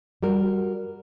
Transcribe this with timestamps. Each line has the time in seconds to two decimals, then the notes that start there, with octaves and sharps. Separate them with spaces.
0.23 G3 F#4 A#4